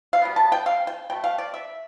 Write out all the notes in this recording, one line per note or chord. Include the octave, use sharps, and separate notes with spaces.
F5
B2 G3 B3
A5
G5
F5
G5
B2 A3 G5
F5
D5
E5